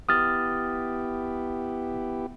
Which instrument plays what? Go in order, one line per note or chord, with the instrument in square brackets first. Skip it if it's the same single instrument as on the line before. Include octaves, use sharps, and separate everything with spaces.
[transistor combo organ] B3 E4 G4 [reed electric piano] D#6 F6 A6